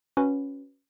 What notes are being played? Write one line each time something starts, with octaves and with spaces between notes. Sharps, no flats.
C#4 F#4 B4